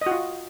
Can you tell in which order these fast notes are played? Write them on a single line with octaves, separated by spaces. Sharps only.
D#5 F#4 F4